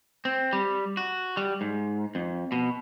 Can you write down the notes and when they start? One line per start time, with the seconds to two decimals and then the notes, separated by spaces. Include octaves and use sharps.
0.25 C4
0.53 G3
0.97 F#4
1.37 G3
1.61 G#2
2.15 F2
2.52 B2